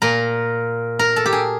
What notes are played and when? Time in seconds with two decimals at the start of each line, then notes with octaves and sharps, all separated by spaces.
0.02 A#2 A#4
0.99 A#4
1.16 A4
1.26 G4
1.33 G#4